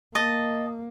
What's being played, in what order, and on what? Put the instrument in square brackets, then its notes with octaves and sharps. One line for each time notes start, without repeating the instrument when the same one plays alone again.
[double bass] A#3 [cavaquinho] D#5 A5